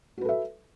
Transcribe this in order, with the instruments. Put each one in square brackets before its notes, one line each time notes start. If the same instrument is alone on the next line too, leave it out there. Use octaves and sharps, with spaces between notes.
[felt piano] F#4
B4
A4
E5